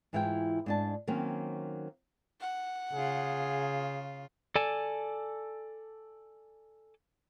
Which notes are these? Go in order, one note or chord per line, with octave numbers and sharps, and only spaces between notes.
G#2 E3 E4 F4 F5 G5
G#2 D4 A5
D#3 F#3 A#3 C4 C#4
F#5
C#3 F4 G#4
A4 D5 G#5 A5